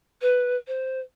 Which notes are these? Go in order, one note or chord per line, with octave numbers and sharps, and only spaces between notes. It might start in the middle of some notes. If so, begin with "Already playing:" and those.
B4
C5